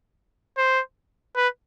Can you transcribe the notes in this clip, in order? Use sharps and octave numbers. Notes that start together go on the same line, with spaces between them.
C5
B4